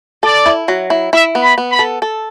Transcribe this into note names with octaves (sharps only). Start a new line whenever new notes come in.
A4 D5
E4
F#3
E4
E4 E5
B3
B5
B3
B5
A4
A4